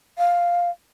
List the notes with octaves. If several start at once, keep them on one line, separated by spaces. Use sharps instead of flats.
F5